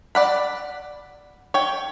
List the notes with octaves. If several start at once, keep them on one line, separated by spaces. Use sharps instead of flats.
D5 F#5 B5
C#5 G5